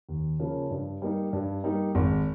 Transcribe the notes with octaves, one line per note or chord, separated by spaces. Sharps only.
D#2
C#3 F3 A#3
G2
G3 A#3 D#4
G2
G3 A#3 D#4
G#1